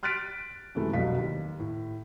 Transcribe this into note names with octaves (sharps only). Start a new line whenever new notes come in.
C6 F6 F#6 A6 B6 D7
F#2 C3 E3 G#3 A3 E4
F1 C2 B2 F#3 F5 B6
D#2
A2